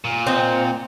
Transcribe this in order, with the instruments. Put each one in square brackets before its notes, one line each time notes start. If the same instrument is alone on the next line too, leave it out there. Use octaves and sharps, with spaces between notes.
[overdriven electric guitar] A#2
[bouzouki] C4 D#5